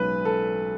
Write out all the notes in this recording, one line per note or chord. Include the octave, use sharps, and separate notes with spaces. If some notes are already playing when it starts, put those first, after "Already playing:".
Already playing: B1 B2 G#3 C#4 B4
A4